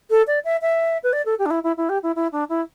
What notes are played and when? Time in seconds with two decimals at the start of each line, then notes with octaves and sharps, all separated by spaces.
0.10 A4
0.27 D5
0.45 E5
0.61 E5
1.03 B4
1.13 D5
1.25 A4
1.39 G4
1.46 D4
1.50 E4
1.63 E4
1.77 E4
1.89 G4
2.03 E4
2.15 E4
2.32 D4
2.49 E4